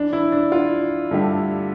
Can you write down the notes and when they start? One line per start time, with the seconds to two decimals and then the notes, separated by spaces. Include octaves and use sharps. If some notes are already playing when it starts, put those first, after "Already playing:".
Already playing: E3 D4
0.13 E4
0.32 D4
0.52 F4
1.11 G2 D3 A3 D4 G4